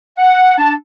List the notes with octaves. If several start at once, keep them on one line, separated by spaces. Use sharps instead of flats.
F#5
D4 A5